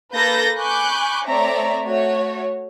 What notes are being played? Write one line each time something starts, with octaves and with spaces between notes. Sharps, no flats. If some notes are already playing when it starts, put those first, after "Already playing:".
A#3 A4 B4 G6 A6 A#6
G#5 B5 C#6 D6 F#6 G6
A3 C4 C#5 D5 E5 A#5
A3 F#4 C#5